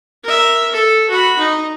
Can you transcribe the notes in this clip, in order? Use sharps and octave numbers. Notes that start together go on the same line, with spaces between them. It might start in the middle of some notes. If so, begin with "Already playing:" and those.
A#4 E5
A4
F#4 B5
D#4